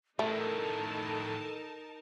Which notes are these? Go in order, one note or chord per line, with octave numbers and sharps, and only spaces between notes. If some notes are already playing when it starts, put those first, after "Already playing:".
A2 D#3 A3 D#4 A4 A#4 A5